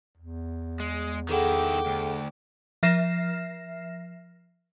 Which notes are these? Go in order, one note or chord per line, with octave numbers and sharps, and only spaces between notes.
E2
G#3
D#3 E4 G#4 A4 F#5 G5 D6
D2
F3 E5 F6 A#6 C7 E7